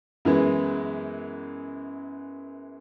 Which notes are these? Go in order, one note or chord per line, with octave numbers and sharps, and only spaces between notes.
F#2 E3 G#3 B3